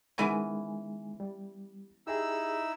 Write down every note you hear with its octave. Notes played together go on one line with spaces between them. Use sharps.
D#3 E3 G#3 B3 C#4 G#5
G3
D#4 E4 G4 G#4 E6